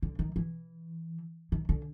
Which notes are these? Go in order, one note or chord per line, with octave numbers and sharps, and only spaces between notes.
D3
D#3
E3
D#3
D3